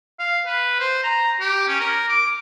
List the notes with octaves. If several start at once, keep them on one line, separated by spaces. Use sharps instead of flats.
F5
B4
C5
A#5
G4
C#4
A#4
D6